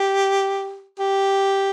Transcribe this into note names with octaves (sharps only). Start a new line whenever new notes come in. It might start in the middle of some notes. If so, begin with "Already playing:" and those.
Already playing: G4
G4